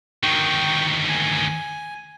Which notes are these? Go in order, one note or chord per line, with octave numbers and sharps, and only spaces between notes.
D2 D#3 G5 C#6
G#5